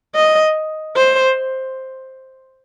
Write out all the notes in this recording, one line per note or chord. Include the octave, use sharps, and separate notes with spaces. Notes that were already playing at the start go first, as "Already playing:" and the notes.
D#5
C5